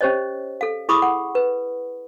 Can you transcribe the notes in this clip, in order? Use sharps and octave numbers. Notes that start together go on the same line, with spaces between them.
C#4 G4 C5 C#5 D#5
A4 F5
E4 G#4 B5 C#6 D#6
F#5
B4